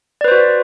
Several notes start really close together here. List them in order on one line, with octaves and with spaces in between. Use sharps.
D5 B4 C5 F#4